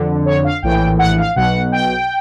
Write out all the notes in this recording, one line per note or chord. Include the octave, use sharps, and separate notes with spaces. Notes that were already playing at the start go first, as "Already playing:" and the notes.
Already playing: F2 D3
C#5
F5
A#1 A2 E3 G5
F#5
F5
B1 B2 F#5
G5